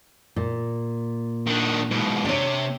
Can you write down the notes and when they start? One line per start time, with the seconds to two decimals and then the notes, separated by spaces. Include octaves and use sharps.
0.36 A#2
1.46 D#3 D4
1.91 G#2 B2
2.25 C3 D4 C#5